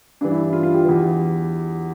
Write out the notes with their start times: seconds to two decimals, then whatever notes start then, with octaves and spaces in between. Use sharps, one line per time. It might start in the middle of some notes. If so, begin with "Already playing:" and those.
0.21 G2 E3 D4
0.31 E4
0.43 E4
0.53 F4
0.63 F4
0.74 G4
0.85 E2 E3